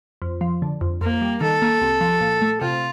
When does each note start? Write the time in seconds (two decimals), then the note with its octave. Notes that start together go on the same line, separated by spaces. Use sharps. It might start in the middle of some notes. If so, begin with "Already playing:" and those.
0.22 F2
0.41 F3
0.62 D3
0.81 F2
1.01 F2 A#3
1.22 G3
1.41 D#3 A4
1.62 A#3
1.82 C2
2.01 F3
2.21 A#2
2.42 A3
2.61 C3 F4